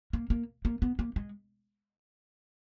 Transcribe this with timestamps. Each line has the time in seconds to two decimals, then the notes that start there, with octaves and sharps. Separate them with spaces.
0.13 A#3
0.30 A#3
0.65 A#3
0.82 B3
0.99 A#3
1.16 G#3